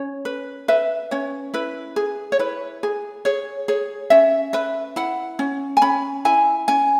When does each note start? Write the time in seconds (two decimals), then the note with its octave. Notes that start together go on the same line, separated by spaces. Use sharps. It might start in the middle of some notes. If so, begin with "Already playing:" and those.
Already playing: C#4 C#5
0.25 B4
0.68 B4 E5
1.11 C#4 C#5
1.54 E4 B4
1.96 G#4
2.32 C#5
2.39 E4 B4
2.83 G#4
3.25 G#4 C#5
3.68 G#4 C#5
4.10 C#4 E5
4.53 B4 E5
4.96 E4 F#5
5.39 C#4
5.77 G#5
5.82 C#4 B5
6.25 E4 G#5
6.68 C#4 G#5